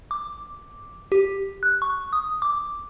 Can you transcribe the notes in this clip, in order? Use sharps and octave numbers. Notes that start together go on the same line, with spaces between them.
D6
G4
F#6
C#6
D#6
D6